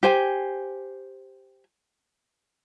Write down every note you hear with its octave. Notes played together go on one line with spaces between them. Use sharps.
G4 C5 G#5